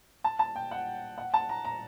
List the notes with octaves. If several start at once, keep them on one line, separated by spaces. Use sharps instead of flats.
A5
A5
G5
F#5
F#5
A5
A#5
A#5